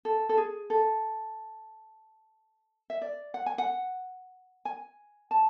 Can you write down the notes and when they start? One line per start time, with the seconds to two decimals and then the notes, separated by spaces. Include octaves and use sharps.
0.05 A4
0.29 A4
0.37 G#4
0.70 A4
2.90 E5
3.02 D5
3.34 F#5
3.46 G#5
3.58 F#5
4.65 G#5
5.31 A5